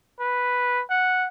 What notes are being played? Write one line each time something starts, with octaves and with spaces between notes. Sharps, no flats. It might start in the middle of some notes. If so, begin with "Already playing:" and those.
B4
F#5